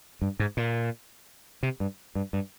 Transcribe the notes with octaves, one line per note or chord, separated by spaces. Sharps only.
G2
G#2
A#2
C3
G2
G2
G2